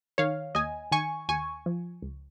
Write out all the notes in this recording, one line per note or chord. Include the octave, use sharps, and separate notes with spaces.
D#3 C#5 F5
D#2 D#5 G#5
D#3 G#5 C#6
D#2 G#5 C#6
F3
C#2